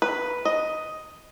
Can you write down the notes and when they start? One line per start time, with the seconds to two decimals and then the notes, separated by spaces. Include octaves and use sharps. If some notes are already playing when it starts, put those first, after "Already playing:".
0.02 B4
0.45 D#5